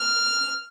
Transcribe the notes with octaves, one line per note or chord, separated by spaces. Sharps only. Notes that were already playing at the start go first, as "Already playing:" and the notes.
Already playing: F6